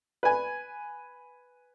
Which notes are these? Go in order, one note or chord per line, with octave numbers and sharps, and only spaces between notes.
B4 G#5